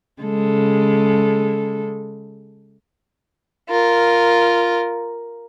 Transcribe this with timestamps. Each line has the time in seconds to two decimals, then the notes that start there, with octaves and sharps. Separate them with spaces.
0.22 C#3 G#3 A4
3.70 F4 A#4